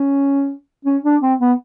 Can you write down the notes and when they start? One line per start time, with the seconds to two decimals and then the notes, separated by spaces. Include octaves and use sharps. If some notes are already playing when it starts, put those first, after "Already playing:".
Already playing: C#4
0.85 C#4
1.04 D4
1.21 C4
1.40 B3